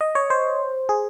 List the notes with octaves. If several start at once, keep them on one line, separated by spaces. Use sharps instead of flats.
D#5
C#5
C5
G#4